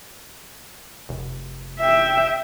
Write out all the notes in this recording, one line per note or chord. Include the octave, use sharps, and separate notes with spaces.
F1
E5 G5